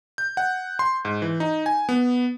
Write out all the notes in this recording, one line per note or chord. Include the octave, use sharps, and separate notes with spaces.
G6
F#5
C6
G#2
E3
D#4
G#5
B3